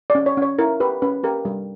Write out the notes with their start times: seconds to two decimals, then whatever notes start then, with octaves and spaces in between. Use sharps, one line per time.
0.10 D5
0.15 C#4
0.26 C#5
0.37 C#4 C#5
0.59 E4 A#4
0.80 G4 B4
1.02 C#4 B4
1.24 G4 A#4
1.45 G3